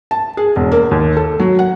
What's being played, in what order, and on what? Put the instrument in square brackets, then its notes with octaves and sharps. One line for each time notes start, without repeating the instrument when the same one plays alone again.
[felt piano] A5
G#4
E1
A#3
D#2
A4
F#3
F#5